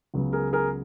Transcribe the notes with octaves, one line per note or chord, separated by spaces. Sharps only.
C#2 C#3 F#3 B3
G#4 A#4
G#4 A#4